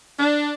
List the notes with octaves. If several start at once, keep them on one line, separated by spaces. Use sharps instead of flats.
D4